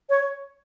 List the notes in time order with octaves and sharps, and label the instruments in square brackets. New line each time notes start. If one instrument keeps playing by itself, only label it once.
[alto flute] C#5